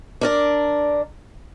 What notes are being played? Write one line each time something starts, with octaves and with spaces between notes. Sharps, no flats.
D4 A#4 D5